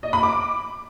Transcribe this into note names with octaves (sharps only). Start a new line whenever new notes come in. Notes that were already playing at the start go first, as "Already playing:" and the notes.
D#5
B5
D6